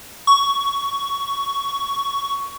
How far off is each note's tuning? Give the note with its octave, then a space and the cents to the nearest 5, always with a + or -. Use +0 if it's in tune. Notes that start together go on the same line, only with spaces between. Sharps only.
C#6 +10